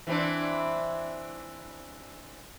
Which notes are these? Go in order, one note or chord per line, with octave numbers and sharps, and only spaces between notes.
E3 C4 D4